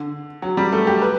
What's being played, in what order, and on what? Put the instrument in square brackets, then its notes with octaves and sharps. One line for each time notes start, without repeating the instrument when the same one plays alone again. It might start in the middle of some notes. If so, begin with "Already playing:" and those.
Already playing: [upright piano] D3
F#3
G3
A3
G4
B4